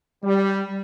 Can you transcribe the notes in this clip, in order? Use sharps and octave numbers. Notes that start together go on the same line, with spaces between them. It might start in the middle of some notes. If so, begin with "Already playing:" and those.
G3